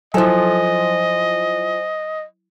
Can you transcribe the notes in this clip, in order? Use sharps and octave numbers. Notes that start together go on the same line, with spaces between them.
F3 F#3 E4 A4 C5 D#5 G#5